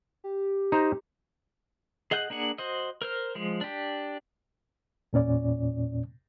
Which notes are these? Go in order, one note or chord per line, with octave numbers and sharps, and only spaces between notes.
G4
D#4 C5 A#5
G#4 D#5 F#5 F#6 G6
A#3 D4 G#4 F#5
F#4 C5 D#5
A#4 C5 F6
F3 G#3
D4 G4
E2 A#2 C#4 D5